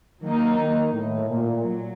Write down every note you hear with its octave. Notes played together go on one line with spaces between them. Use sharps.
D#3 F#3 A#3 D#4
D#3
A2
A#2
F#3